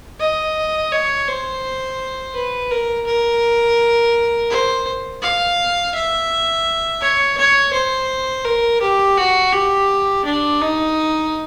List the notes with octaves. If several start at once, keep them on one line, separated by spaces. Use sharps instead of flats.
D#5
C#5
C5
B4
A#4
A#4
C5
F5
E5
C#5
C#5
C5
A#4
G4
F#4
G4
D4
D#4